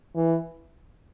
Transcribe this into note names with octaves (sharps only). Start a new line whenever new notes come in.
E3